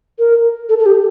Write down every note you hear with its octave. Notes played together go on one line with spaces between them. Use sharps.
A#4
A4
A4
G4